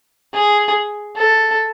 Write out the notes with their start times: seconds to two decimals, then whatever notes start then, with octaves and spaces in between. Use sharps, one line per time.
0.33 G#4
1.16 A4